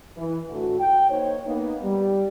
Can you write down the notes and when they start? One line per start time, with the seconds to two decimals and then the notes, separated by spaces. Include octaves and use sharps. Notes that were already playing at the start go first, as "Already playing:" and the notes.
0.17 E3
0.50 A2 D3 A3 F#4
0.79 G5
1.09 A#3 D#4 C5 C#5
1.46 A#3 B3 D#4
1.83 G3